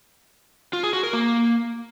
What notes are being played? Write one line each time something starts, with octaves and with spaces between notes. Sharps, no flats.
F4
G#4
F#4
A#4
A#3